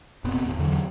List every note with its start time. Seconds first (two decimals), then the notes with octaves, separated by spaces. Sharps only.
0.24 F1 A#2 B3 C4
0.44 D1
0.58 E2 D3 F#3